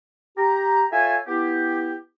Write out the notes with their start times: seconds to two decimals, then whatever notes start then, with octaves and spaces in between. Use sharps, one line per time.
0.37 G4 A#5
0.92 F4 A4 C#5 E5 G#5
1.27 B3 E4 G4